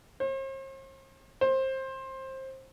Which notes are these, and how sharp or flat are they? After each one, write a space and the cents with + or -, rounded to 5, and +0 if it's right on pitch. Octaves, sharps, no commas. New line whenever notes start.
C5 +45
C5 +20